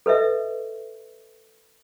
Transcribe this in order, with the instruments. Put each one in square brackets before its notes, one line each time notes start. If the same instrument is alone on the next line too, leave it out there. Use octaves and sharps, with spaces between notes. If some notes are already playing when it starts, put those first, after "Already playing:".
[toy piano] A4 B4 D#5 E5